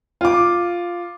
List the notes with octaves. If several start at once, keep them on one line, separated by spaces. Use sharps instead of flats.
F4 D6